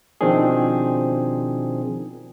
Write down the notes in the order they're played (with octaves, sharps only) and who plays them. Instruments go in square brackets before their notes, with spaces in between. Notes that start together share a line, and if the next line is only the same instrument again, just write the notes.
[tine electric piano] B2 D#3 F3 C4 D4 G#4